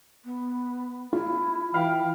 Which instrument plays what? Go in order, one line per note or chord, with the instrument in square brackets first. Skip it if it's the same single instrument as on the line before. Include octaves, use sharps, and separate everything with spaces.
[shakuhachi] B3
[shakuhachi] E4 [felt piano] F4
[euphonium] E3 [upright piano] F5 B5 F6 [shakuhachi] G5